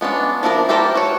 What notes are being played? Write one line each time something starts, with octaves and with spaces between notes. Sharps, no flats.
G#3 B3 C#4 D4
F3 D4 E4 A4 A#4
E4 G4 A4 A#4 C5
F#4 C#5